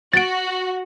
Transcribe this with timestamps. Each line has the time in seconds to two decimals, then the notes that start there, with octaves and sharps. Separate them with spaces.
0.14 F#4 A6 D7